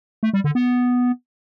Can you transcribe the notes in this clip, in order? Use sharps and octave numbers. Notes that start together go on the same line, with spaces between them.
A3
G3
D3
B3